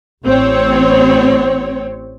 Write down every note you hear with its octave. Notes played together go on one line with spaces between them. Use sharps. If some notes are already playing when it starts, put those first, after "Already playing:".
A1 C4 C#5